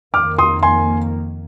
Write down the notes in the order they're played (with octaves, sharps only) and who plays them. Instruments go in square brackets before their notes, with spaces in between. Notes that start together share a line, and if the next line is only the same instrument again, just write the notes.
[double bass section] F2 D#3 A#3 [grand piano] D6 F6
[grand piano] C6 D#6
G#5 C6